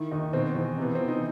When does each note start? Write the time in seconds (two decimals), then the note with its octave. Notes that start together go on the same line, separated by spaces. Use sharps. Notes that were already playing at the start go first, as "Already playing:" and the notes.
Already playing: D#3 E4
0.11 D#2 D#4
0.33 B2 C4
0.55 E2 C4
0.78 C3 B3
0.95 E3 C4
1.08 D#4